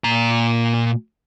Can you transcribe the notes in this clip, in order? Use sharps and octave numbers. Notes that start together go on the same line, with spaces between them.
A#2 A#5